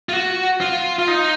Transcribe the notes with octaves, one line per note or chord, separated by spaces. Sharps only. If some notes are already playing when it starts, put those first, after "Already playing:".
F4
F#4
F4
F4
D#4